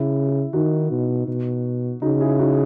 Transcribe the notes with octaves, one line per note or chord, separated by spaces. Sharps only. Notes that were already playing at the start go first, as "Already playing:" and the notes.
Already playing: C#3 E4
E4
D#3 D#4 F#4
B2
B2
C#3 D#4 F#4
E4 G#4
D#4 F#4